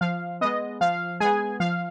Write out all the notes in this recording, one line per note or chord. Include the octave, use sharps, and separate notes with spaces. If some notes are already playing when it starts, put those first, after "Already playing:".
F3 F5
G#3 B3 D#5
F3 F5
G#3 B3 G#4 G#5
F3 F5